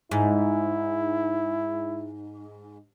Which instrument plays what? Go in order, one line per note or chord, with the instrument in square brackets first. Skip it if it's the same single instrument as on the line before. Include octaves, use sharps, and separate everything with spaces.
[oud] G#2 [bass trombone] E4